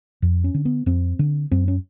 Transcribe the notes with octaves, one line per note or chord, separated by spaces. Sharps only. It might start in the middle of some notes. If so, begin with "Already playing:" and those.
F2
C#4
D3
B3
F2 C4
D3
F#2 C4
C#4